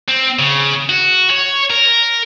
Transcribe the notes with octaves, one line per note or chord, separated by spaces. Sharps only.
C4
C#3
F#4
C#5
A#4